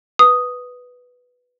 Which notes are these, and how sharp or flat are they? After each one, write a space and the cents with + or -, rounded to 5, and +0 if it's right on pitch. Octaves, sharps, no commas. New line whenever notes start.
B4 +0 D#6 +0